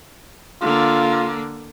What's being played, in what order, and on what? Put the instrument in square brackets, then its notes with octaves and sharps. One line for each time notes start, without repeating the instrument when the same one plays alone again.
[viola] D3 A#3 [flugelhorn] F4